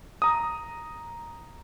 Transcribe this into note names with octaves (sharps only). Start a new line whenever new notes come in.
A#5 D#6